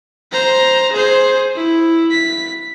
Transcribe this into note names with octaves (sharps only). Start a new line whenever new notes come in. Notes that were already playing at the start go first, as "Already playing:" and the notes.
C5 A#5
G#4 C5
E4
B6